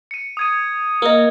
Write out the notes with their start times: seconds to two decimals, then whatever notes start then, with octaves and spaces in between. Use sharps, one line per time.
0.11 C#7 D#7
0.37 D#6 G#6 D#7
1.02 A#3 A#4 D#5